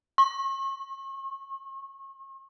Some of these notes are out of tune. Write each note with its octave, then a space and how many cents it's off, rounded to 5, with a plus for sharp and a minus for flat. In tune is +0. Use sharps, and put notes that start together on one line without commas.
C#6 -40